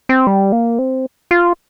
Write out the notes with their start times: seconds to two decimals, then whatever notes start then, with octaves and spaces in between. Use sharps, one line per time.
0.09 C4
0.27 G3
0.52 A#3
0.79 C4
1.31 F4